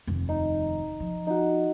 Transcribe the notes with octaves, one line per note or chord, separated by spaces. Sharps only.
F1 D#2
D#4
F3
D#4 F#4